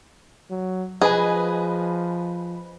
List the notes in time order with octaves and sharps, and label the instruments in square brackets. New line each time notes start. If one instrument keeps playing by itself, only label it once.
[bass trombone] F#3
[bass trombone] F3 [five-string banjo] G#4 [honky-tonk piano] B4 D#5 G#5